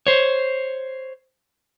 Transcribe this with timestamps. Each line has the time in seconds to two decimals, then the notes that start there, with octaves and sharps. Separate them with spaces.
0.07 C5 C#5